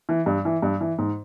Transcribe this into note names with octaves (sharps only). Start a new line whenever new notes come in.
E3
G2
E3
G2
E3
G#2